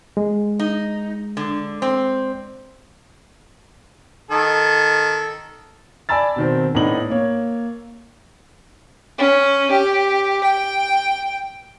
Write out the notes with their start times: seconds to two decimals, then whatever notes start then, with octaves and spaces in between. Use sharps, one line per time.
0.17 G#3
0.59 D#4
1.37 D3
1.82 C4
4.31 D#3 A4
6.09 D5 G#5 A5 B5 E6 A6
6.36 B2 D#3 C4
6.75 A2 B3 D4 D#4 F#7
7.10 A#3 C#5
9.18 C#4
9.71 G4
10.44 G5